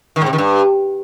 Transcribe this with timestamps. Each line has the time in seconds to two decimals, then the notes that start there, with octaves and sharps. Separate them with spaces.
0.16 D#3
0.22 G#2
0.27 C3
0.33 D#3
0.38 G2